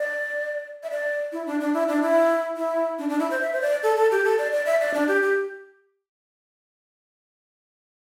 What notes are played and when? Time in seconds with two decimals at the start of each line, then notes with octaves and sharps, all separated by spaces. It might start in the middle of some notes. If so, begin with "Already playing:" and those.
Already playing: D5
0.83 E5
0.90 D5
1.32 E4
1.47 D4
1.60 D4
1.74 E4
1.88 D4
2.02 E4
2.57 E4
2.99 D4
3.09 D4
3.20 E4
3.31 C5
3.42 E5
3.53 C5
3.62 D5
3.83 A4
3.97 A4
4.11 G4
4.25 A4
4.38 D5
4.52 D5
4.66 E5
4.81 D5
4.94 D4
5.08 G4
5.22 G4